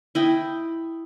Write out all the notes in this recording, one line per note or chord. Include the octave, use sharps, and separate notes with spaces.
E4 D#5 G5